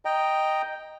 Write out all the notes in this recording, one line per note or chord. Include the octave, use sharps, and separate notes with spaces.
D#5 G5 A#5